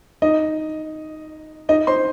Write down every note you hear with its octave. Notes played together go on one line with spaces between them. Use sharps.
D#4 D#5
D#4 D#5
C5 C6